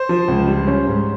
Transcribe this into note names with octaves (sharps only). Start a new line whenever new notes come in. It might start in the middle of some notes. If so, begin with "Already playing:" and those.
Already playing: C5
F3
C#2
G3
C#4
G#2